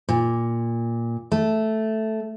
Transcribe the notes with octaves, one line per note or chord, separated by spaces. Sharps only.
A#2
A3